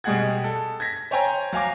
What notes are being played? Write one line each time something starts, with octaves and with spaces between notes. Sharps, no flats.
B2 G3 G#3 G#4 F#5 G#6
A4
G#6 A#6 B6
C5 C#5 G5 G#5 A#5
F#3 F5 G#5 D6